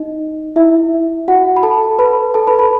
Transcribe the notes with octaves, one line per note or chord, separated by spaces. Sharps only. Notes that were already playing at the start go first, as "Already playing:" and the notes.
Already playing: D#4 D#5
E4 E5
F#4 F#5
B5
A4 A5
B4 B5
A4 A5
B4 B5
B4 B5